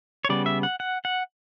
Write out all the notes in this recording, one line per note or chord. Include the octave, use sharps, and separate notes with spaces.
C#5
C#3 G3 B3 D5
E5
F#5
F#5
F#5